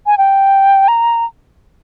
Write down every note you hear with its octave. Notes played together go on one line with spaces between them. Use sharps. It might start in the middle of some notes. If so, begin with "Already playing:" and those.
G#5
G5
A#5